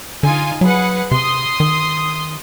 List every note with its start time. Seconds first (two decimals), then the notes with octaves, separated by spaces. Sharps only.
0.23 D3 D#4 F4 G#5
0.61 F#3 G#4 B4 F#5
1.11 C3 C6 D#6
1.60 D#3